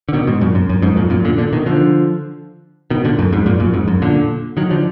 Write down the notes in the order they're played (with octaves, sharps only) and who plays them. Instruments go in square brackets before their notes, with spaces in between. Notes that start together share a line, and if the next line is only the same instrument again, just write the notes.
[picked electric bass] D3
B2 D#3
G#2 B2
F#2 A#2
F#2
F#2
F2 G#2
F#2 A#2
F#2 A#2
A#2 D3
A#2 D3
B2 D#3
D3 F3
B2 D#3
A#2 D3
F#2
F2 G#2
F#2 A#2
F#2 A#2
F2 G#2
F#2
A#2 D3
D#3 F#3
D3 F3